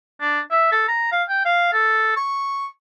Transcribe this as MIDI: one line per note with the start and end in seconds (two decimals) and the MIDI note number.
0.21 0.40 62
0.51 0.71 76
0.72 0.84 69
0.88 1.07 82
1.12 1.23 77
1.29 1.45 79
1.45 1.71 77
1.73 2.16 69
2.17 2.67 85